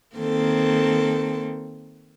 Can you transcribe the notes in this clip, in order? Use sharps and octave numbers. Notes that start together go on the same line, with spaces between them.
D#3 A#3 C4 A4